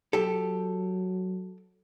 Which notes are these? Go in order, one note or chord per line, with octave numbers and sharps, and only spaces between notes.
F#3 G4 A4